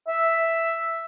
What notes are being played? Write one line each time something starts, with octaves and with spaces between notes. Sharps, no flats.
E5